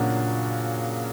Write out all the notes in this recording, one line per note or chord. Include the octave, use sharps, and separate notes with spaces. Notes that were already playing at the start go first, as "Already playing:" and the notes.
Already playing: A#2 C#3 F#3 A#3 D4 F#4